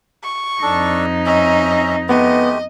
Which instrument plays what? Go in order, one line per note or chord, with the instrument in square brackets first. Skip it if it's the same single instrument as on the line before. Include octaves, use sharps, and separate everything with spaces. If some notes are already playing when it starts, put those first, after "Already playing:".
[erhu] C#6
[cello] F2 D#4 [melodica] D4 A4
[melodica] C#4 E5 A#5 [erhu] D#5
[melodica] G#3 A3 G4 [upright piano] B3 [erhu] D#5